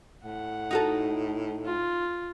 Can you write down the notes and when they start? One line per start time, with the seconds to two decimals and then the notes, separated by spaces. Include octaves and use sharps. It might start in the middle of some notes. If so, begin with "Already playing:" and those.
0.24 A2 F#5
0.71 D#4 F#4 A4
1.65 F4